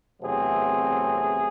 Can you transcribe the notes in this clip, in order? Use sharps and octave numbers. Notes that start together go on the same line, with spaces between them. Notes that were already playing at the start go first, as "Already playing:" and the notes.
E2 C3 F#3 A3 C4 G#4